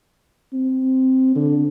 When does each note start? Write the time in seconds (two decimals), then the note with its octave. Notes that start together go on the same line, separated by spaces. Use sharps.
0.53 C4
1.35 D3